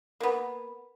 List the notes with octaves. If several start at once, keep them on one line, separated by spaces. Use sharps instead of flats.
A#3 B3